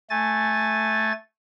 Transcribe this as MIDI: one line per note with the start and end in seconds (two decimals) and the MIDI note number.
0.10 1.12 57
0.10 1.12 80
0.10 1.12 93